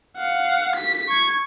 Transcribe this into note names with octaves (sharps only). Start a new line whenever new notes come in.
F5 F#5
B6
C#6 G#6